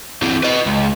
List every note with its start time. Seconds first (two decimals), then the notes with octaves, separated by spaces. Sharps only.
0.22 E3 C4
0.43 B4 D#5
0.66 C#2